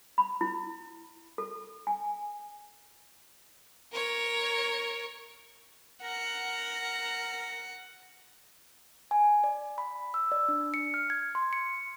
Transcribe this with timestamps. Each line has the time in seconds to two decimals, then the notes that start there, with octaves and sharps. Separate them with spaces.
0.18 B5
0.41 E4
1.38 A4
1.87 G#5
3.92 A#4 C#5
6.03 A#4 F#5
9.11 G#5
9.44 D5
9.78 B5
10.14 E6
10.32 D5
10.48 D4
10.74 C#7
10.94 F6
11.10 G#6
11.35 C6
11.53 C#7